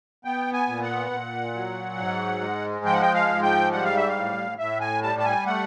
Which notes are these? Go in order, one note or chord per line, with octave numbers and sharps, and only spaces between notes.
B3 G5
G#5
A#2
F#5
A#2
F#3
G#2
G#3
F3 G5
F#5
G5
F5
G#2
G5
G3 F#5
F5
E5
F5
A2
A2 E5
G#5
G3 A5
A5
G#5
A3 F#5